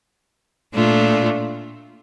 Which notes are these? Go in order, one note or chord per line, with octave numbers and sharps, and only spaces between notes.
A#2 A3 D4 F4